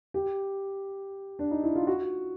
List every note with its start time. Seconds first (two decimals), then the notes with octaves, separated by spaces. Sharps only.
0.14 G4
1.39 D4
1.51 D#4
1.64 E4
1.76 F4
1.87 F#4